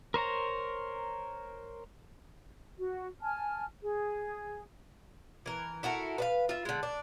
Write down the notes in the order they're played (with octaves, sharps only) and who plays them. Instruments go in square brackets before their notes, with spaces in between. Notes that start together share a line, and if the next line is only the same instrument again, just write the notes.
[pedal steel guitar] A#4 C5 C#5 A#5
[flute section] F#4
G#5 A5 F6
G#4
[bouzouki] E3 A#4
E4 F#4 A4 A#4
B4 D5 F5
F4 E5
D3 G#3
D4